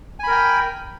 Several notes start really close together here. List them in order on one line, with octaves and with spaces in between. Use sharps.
G#5 B5 A#4 G5